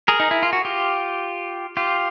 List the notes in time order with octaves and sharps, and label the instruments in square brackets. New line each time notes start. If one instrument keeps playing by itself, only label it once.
[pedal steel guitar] G#4 A#4
D#4
E4
F4
F#4
F4 G4
F4 G4